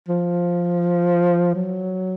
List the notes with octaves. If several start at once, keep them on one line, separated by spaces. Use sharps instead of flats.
F3
F#3